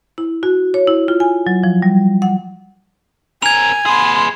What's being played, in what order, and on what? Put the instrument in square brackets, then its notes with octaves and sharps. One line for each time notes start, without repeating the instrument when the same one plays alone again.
[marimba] E4
F#4
C#5
E4
F4
G#5
F#3
F3
G3
F#5
[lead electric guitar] C4 A#4 [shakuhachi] G#5 [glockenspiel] G#6 F7
[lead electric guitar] G#4 B4 [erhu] C6